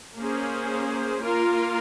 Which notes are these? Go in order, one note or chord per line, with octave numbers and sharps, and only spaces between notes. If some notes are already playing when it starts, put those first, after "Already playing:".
A#3 C#4 G#4 C5
A#3 F4 A#4